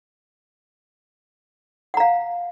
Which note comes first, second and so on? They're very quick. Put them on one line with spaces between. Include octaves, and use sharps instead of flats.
F#5 A#5 F5